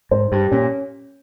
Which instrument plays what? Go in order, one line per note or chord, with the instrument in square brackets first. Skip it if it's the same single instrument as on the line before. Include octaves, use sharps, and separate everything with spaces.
[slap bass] G#2 [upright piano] C5
[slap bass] G2 [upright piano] G4
[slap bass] A#2 [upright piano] C#4